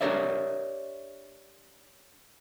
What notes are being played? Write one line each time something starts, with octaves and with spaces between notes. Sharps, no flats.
D4 G4 A#4 C#5 D5 E5